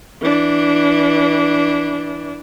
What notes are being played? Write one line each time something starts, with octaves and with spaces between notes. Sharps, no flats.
E3 D4